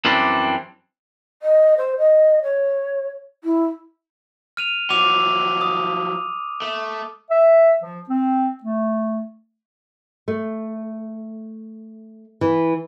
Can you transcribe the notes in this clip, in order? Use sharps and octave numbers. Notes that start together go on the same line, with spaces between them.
F#2 E3 G3 C4 D4
D#5
C5
D#5
C#5
E4
F6 D#7 F7
F3 F#3 D6 D#7 F7
D#6
A3
E5
F3
C4
A3
A3
E3